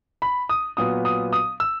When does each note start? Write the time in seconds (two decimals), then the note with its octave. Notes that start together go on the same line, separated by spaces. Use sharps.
0.22 B5
0.49 D#6
0.77 A#2 F#3 B3 D#6
1.05 D#6
1.33 D#6
1.60 E6